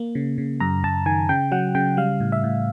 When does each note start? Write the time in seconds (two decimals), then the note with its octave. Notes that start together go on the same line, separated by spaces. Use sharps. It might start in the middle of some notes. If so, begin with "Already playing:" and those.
Already playing: A#3
0.15 C#3
0.38 C#3
0.60 F#2 A#5
0.84 F#2 A5
1.06 D#3 G#5
1.29 C#3 G5
1.52 F#3 F#5
1.75 C#3 G5
1.97 G3 F5
2.20 A2
2.32 E5
2.44 A2